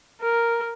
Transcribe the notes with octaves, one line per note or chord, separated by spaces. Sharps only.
A#4